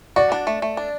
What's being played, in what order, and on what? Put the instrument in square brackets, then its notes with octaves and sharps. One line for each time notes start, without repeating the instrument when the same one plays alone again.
[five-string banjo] F#4 [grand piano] D5
[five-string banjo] D4
A3
A3
D4